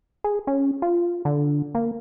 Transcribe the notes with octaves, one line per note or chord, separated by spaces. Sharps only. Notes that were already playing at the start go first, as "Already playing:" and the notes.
G#4
C#4
F4
D3
A#3